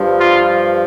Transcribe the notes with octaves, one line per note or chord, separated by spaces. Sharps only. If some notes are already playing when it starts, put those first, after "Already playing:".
Already playing: G2 F3
F4